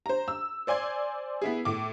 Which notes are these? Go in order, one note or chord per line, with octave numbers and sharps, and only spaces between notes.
C5 A#5
E6
C5 D5 G#5 C6 G#6
B3 E4 G#4
A2 D6